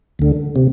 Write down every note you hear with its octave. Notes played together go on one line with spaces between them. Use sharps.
D2 D3
C3